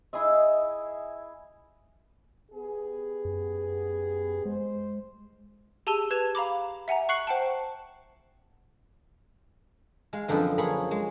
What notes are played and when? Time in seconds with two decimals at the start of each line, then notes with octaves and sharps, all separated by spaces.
0.13 E4 G#4 D#5 E5
2.51 B3 G4 G#4
3.25 F#2
4.46 G#3 C5
5.87 G4 G#4 A5 E6 D#7 G7
6.10 G4 B4 G#6 E7
6.35 F5 A#5 B5 D6
6.88 E5 F#5 G#5 A#5
7.09 C#6 F#6 C7 C#7 F#7
7.27 C5 F#5 G5 A5
10.13 G#3 F5
10.28 F#2 D3 F3 C4 B4 D#5
10.58 A#3 G#4 A4 C#5 B5
10.91 G#3